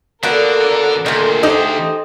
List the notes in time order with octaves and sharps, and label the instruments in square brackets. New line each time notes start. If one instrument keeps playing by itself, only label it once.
[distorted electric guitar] D3 [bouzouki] A#3 B3 F#4 [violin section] A4 A#4 D5
[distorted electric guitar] D2 [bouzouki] A#2 D#3 [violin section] G#4 A4
[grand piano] D#4 [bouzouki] G4 C5 D#5